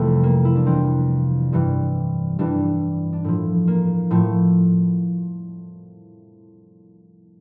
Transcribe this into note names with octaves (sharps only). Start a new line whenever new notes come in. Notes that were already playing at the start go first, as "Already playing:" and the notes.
Already playing: F2 C3 E3 G3 A3
A#3
E4
D4
F2 C3 E3 G3 C4
G2 E3 G3
G2 E3 G3 D4
D4
A2 F3 E4
A#3
A2 F3 A3